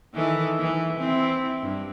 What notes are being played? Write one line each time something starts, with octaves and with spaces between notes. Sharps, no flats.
D#3 E3 A4
E3
C4 E4
G2